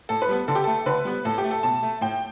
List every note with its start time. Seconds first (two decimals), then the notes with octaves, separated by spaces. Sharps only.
0.09 A2 A4
0.22 B4
0.29 G3 B3
0.48 D3 A4
0.55 G4
0.64 A3 A4
0.86 D3 B4
1.05 G3 B3
1.25 A2 A4
1.38 G4
1.44 A3
1.51 A4
1.63 B2 A5
1.83 A3
2.01 A2 G5